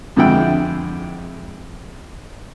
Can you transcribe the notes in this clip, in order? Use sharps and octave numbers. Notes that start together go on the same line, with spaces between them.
F2 D3 G#3 E4 F#5 G5